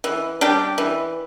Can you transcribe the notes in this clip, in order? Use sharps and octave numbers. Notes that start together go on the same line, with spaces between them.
E3
G3 D4 G4
E3